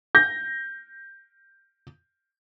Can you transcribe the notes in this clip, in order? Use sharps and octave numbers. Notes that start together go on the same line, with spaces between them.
G6 A#6